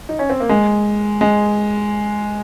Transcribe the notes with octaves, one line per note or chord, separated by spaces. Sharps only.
D#4
C#4
C4
A#3
G#3
G#3